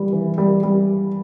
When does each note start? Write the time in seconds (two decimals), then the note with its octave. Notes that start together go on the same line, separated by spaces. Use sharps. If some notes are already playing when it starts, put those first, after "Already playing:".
Already playing: E3 G3
0.12 E3
0.38 G3
0.63 G3